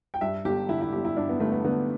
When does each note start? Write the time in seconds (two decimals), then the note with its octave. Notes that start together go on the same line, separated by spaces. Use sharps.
0.14 G5
0.21 G2 E5
0.45 G1 G4
0.69 D3 E4
0.81 E4
0.93 G1 G4
1.05 E4
1.17 G2 D4
1.29 B3
1.40 G1 A3
1.52 B3
1.65 D3 B3